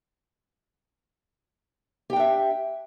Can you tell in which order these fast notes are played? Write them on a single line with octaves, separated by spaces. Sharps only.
G4 G5 D4 E5